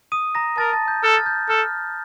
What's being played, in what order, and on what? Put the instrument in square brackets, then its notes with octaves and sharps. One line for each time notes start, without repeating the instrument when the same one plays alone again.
[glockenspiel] D#6 D#7
A#5 A#6
[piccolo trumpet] A#4 [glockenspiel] A5 A6
[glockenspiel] A5 A6
G6
[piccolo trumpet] A4 [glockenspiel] F6
[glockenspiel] A6
G6
[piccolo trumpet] A4 [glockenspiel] F6